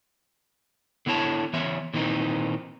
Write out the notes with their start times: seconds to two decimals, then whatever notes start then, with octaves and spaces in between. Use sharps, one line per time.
1.06 D3 B3 E4 C#5 A5
1.53 E3 B3 C#5 E5
1.94 A#2 D#3 E3 C4 D#4